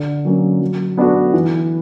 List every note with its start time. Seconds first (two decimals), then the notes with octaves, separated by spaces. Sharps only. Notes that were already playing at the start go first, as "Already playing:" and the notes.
Already playing: D3
0.25 F#3 A#3 C#4
0.61 F#3
0.97 B3 D4 F#4 A4
1.33 E3